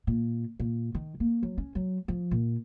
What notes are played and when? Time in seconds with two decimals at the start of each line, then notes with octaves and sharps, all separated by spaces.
0.07 A#2
0.60 A#2
0.95 D#3
1.20 A#3
1.43 F#3
1.58 C#4
1.75 F#3
2.08 F3
2.31 A#2